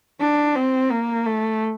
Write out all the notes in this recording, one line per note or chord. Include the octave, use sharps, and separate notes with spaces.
D4
C4
A#3
A3